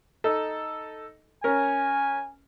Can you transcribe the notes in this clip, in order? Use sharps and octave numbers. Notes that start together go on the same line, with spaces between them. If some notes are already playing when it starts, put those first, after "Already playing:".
D#4 A4
C#4 A#4 G#5